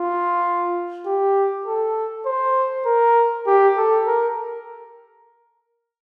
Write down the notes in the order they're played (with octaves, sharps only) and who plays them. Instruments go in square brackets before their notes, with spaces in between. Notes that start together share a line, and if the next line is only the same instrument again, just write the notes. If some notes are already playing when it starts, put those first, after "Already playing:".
Already playing: [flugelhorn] F4
G4
A4
C5
A#4
G4
A4
A#4